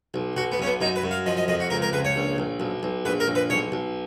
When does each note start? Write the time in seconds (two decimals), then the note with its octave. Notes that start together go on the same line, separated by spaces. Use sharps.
0.14 B1
0.37 B1 F#4
0.52 B3
0.60 B1 C#4
0.66 B3
0.81 F#2 D#4
0.96 B4
1.04 F#2
1.11 F5
1.26 F3 D#5
1.37 D#5
1.48 F2 D#5
1.60 F#4
1.70 C#2 A#4
1.82 A#4
1.93 C#2 B4
2.05 C#5
2.16 A#1
2.38 A#1
2.60 B1
2.83 B1
3.05 A#1 B4
3.20 A#4
3.28 A#1
3.35 B4
3.50 B1 C#5
3.72 B1